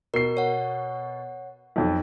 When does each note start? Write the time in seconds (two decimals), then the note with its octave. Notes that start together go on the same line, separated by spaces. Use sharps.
0.14 B2 A#4 C7
0.37 C#5 F#5
1.76 B1 F2